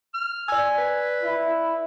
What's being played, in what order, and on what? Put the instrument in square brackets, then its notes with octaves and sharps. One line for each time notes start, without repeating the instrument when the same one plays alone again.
[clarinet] F6
[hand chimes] D5 E6 [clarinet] G#5
[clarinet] B4
[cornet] E4